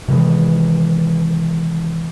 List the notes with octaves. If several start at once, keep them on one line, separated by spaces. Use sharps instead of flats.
C3 D#3 E3 G#3